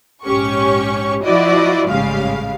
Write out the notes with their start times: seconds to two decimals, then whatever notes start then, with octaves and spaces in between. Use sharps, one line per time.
0.24 A#1 G#2 C#4 G4 C#5 C#6
1.23 F3 E4 F#4 D5 D#5
1.88 A1 G#2 C#3 G3 G#3 F5